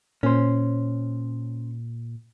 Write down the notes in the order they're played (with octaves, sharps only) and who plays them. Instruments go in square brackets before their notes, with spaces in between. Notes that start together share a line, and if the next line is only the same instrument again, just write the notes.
[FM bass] A#2 [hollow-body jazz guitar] C#4 C5